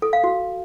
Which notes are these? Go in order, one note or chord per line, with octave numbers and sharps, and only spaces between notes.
A4
F5
F#4